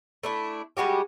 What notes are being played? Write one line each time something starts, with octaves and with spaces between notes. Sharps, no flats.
A3 D4 E4
G3 G#3 F#4 G4